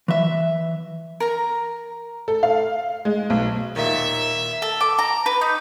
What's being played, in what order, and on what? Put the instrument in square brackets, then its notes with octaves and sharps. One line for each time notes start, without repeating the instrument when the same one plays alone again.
[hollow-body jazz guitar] E3 E5
[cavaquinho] A#4 A#5
[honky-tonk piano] A4
F5
G#3
B1
[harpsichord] D#2 A#2 [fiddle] E5
[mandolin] A4
D6
A#5
B4
D#4